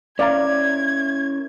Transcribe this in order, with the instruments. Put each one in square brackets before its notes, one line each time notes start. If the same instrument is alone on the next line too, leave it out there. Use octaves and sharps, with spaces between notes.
[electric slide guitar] C#4 E4 A#4 [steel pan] D5 F5 A#5 [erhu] G#6